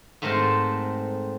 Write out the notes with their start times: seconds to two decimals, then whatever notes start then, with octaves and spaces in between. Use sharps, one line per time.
0.22 G#2 A3 C4 A#4 C5 A5